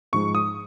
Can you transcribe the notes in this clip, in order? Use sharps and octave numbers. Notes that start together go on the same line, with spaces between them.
G#2 F3 G#3 D#4 C#6
D#6